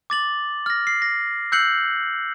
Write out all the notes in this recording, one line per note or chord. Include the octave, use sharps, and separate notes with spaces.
D6 A6 F#7
F6 A#6
C7
A#6
E6 F#6 G6 C7 C#7 F#7